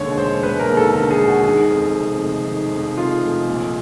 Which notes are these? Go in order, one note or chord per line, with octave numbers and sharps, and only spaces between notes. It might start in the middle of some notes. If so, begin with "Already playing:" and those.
Already playing: E1 D#2 D3 C#5
E1 C5
E1 B4
A#4
D#2
A4
D3 A#4
G#4
E1
F#4
D#3 G#4
F2
C3
F1
D#3
F2
C3 F4
F1
A#1